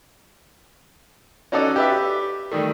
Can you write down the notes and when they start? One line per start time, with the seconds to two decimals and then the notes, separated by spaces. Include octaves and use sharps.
1.52 C#4 D#4 F#4 A4 D5 F#5
1.76 G4 B4 D5 E5
2.52 D#3 G3 A3